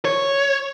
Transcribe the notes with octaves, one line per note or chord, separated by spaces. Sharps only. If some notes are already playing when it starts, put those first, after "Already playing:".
C#5